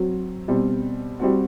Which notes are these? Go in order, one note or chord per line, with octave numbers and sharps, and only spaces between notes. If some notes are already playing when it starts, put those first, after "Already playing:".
Already playing: F#3 C4 F#4
B2 G3 C4
G3 C4 F#4